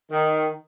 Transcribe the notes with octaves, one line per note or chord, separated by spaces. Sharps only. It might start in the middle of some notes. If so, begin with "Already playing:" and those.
D#3